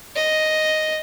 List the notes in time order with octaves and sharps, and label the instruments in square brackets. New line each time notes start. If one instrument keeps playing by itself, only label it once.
[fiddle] D#5